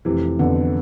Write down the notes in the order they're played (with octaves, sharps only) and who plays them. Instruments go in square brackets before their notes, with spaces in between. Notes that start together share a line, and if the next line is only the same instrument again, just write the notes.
[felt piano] F1 [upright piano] C3 E3
[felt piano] F2 E3 B3 [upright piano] D3